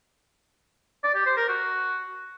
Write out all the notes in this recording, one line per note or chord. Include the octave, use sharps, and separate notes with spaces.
D5
G4
C5
A#4
F#4